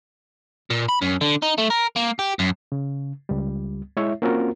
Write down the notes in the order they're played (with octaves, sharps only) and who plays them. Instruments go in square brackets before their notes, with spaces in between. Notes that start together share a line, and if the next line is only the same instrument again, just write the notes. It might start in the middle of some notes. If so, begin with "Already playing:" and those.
[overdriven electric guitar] A#2
B5
F#2
D3
D#4
A3
A#4
A#3
G4
F#2
[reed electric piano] C#3
C#2 G3
G#3 E4 C#5 E5
A#3 C4 C#4 F4 F#4 A#4